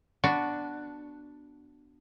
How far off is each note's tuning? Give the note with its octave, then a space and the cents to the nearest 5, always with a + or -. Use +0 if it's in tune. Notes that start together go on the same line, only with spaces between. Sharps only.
B3 +0 D4 +0 F#4 +0